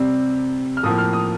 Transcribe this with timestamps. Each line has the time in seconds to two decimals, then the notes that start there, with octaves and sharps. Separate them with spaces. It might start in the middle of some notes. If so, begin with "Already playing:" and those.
Already playing: C3 G3 C4
0.77 F6
0.83 A2 F3 A#3 D#6
0.98 F6
1.13 D#6